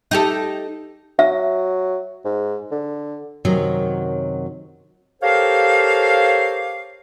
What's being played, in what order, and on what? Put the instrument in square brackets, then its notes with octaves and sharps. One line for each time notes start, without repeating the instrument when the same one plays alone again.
[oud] D#4 G4 A4
[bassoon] F#3 [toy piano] E5
[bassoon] G#2
D3
[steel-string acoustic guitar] F#2 C3 D#3 F#3
[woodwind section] G4 A4 A#4 C5 C#5 F5